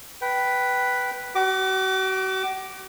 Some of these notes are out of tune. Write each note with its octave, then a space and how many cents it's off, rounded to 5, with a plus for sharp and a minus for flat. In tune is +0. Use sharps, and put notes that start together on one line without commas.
B4 +0 G5 -20
F#4 +40 D6 +0